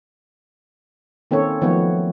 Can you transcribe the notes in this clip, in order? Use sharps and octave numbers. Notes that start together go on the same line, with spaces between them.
D#3 A#3 C4 C#4 A4 C#5
D#3 F3 F#3 A3 B3 C#5